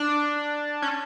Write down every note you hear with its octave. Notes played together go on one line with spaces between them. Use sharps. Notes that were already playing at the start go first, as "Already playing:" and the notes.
Already playing: D4
C#4